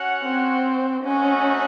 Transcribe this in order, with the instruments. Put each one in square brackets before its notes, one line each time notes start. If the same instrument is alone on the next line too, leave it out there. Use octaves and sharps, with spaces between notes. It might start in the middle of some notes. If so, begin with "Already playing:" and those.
Already playing: [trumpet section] C#4 F#4 C#5 F#5
[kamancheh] C4
[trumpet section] A3 D#4 F#4 C5 F#5 [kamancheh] C#4